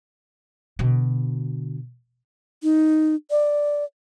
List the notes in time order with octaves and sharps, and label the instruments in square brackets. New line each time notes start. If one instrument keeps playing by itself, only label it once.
[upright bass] B2 D3
[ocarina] D#4
D5